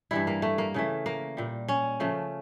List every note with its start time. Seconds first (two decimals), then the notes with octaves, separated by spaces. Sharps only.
0.11 G2 E3 G3 E4
0.27 A#3
0.42 A3
0.58 A#3
0.74 C#3 E3 A3
1.06 A#3
1.37 A#2 G3
1.68 C#4
2.00 C#3 F3 A3